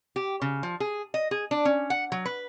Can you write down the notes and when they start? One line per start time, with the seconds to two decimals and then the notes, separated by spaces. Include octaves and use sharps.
0.16 G4
0.42 C#3
0.63 F3
0.80 G#4
1.14 D#5
1.31 G#4
1.51 D4
1.65 C#4
1.90 F#5
2.12 F#3
2.25 B4